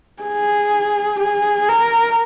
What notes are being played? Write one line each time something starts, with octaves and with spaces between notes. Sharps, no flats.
G#4
G#4
A#4